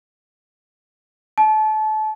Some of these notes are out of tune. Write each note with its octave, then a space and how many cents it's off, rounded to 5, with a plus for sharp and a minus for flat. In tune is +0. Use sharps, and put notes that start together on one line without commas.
A5 -30